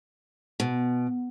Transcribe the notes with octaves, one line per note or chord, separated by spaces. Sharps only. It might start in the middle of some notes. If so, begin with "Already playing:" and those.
B2